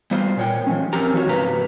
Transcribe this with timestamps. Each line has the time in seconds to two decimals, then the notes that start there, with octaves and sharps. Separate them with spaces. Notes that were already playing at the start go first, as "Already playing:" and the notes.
0.11 G3 B3 F4 C5
0.37 A#2 C#5 G5
0.67 F3 G3 C#4
0.93 F2 C4 C#4 G4 A#4 A#5
1.14 F3 D#4 F#4 A#4 C#5
1.28 G#2 C#3 B4 A#5